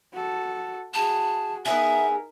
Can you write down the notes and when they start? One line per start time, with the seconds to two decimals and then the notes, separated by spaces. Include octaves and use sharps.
0.13 F#4 A4
0.94 F#4 G#4 A5
1.66 B3 D#4 E4 G#4 A#4 E5